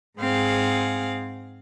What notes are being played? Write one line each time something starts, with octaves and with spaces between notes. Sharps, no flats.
G#2 C4 G#4 F5 F#5